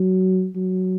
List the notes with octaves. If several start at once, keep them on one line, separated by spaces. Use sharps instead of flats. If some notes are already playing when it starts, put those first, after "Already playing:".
Already playing: F#3
F#3